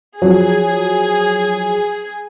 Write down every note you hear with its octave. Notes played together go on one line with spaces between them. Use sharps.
F3 F#3 G#4